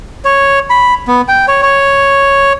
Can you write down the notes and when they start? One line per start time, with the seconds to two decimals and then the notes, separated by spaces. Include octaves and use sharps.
0.25 C#5
0.70 B5
1.08 B3
1.28 G5
1.48 C#5
1.63 C#5